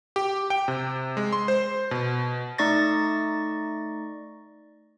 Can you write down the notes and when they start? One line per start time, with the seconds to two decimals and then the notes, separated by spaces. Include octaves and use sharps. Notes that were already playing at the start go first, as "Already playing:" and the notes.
0.16 G4
0.50 G5
0.68 C3
1.17 G#3
1.33 C6
1.48 C5
1.91 B2
2.58 A3 D#4 D5 C#6 A6 A#6